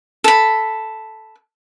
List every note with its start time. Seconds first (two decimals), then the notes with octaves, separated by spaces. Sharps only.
0.24 A4 B5